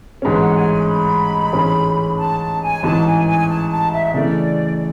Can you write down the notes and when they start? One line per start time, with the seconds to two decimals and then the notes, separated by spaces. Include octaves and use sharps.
0.22 A1 G#2 G#3 C#4 B4
0.39 F#5
0.55 G#5
0.71 B5
0.88 B5
1.52 A1 G#2 G#3 C#4 G#4
2.18 A5
2.40 A5
2.62 G#5
2.83 A1 G#2 E3 A5
3.06 G#5
3.27 G#5
3.49 A5
3.70 A5
3.92 E5
4.14 C#3 E3 A3 D5